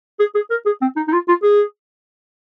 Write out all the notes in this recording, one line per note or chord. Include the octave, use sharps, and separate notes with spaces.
G#4
G#4
A#4
G#4
C4
D#4
D#4
F4
F4
G#4